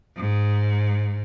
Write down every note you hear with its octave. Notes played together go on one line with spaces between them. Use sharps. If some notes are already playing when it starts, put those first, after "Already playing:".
G#2